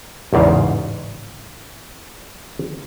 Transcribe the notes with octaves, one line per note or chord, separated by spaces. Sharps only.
A1 E2 G#2 C#3 F5